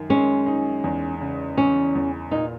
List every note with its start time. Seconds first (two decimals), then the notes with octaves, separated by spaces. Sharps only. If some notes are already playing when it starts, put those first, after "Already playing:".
Already playing: F#2 D#3
0.10 G#3 C#4
0.46 D#4
0.84 E2
1.21 C#3
1.57 E3 C#4
1.95 E2
2.31 A#2 D#4